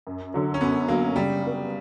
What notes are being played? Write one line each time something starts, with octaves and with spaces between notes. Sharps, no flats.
F#2
D3 F#3
C#4
F#2 B3
D3 F#3 A#3
C#3 G3
G3 B3